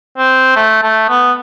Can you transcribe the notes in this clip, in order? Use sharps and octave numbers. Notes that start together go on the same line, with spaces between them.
C4
A3
A3
B3